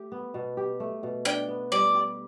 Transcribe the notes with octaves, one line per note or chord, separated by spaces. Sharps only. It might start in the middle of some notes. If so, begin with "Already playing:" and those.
Already playing: A3 G4
B3
B2
G4
A3
B2
D4 G5
B3
G3 D5
G4